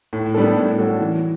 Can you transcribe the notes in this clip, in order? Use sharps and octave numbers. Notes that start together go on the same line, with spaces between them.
A2
G3 B3 D4 A4
A2
G3 C#4 F#4 A4
E3